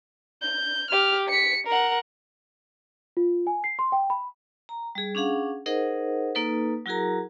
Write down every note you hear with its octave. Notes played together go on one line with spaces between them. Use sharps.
G6
G4 F6
B6 C#7
A#4 F#5
F4
G#5
C7
C6
G5
B5
A#5
G3 G#4
C#4 D4 G#4 F5 F#5
D#4 G#4 A#4 C5 D#5 F#5
A#3 D#4 A4 B4
F#3 E4 F#4 G#4 A#4 A#5